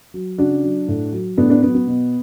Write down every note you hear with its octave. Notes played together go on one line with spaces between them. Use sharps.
F#3
C#3 D4 F#4
F#3
A2
F#3
A2 B3 D4
B3 D4
F#3 B3
B3
B2